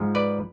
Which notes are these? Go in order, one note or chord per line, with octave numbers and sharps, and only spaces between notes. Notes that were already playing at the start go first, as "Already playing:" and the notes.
Already playing: G#2 F3 G#3
B4 D5